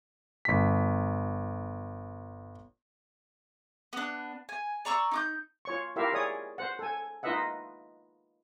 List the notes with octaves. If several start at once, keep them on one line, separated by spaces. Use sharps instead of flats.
G1 B6
B3 D4
G#5
D5 A#5 C#6 E6
D#4 D6 G6
F4 C#5 C#6
E4 F4 G4 A#4 E5 F5
G#4 C#5 D5 D#6
C5 F#5
A4 G#5
D#4 F4 B4 D#5 E5 F#5